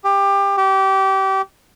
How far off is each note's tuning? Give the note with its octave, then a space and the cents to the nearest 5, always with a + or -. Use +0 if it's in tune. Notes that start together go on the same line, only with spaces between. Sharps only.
G4 +20
G4 -25